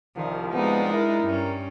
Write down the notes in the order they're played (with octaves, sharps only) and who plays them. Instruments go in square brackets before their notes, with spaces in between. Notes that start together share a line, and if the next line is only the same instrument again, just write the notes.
[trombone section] C2 F3 [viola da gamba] D#3
[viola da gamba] G#3 D4 D#4 [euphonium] B3
[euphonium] E4 [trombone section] A#4
[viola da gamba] G2 C#4